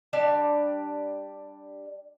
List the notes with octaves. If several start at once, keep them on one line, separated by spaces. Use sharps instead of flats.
G3 D4 D5 A5